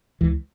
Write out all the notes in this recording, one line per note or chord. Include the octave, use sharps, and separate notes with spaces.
C#2 E3